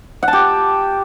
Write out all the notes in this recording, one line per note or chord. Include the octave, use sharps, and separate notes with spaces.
F#5
A5
G4